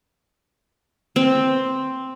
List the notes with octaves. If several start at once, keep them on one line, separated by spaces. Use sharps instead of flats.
C4